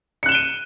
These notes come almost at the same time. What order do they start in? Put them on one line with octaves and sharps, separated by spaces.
C#7 F#6 E7 G7 D#7